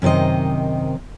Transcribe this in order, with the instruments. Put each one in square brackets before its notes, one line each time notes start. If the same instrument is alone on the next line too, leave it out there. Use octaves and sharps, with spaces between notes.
[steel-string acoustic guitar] F#2 C3 D#3 C5 D#5